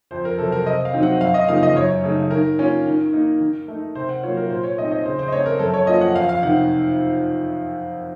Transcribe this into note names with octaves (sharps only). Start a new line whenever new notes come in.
F2 C5
A#4
C3 F#3 A4
A#4
C3 D#5
F5
D#3 F#3 C4 D#4
F#5
F#2 F5
D#5
C#3 F3 A#3 D#4 F5
D#5
F#2 C#5
C#3 A3 D#4
D#3 A#4
A#3 C#4 F4
D#3
A#3 D#4
D#3
A3 D#4
C3 C5
F#5
F#3 A#3 F4 C#5
A#4
A#2 C5
C#5
A3 C4 D#4 D#5
D#5
C#3 C5
C5
D#5
A3 C4 C#5
A#4
F#2 A4
C#5
F3 A#3 C#4 F4 D#5
F#5
F2 F5
F5
C3 D#3 F#5